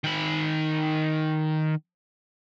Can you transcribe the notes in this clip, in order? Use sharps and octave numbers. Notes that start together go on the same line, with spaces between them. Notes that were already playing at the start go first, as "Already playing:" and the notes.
D#3 B5